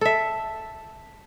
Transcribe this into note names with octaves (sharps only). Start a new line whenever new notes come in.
A4 E5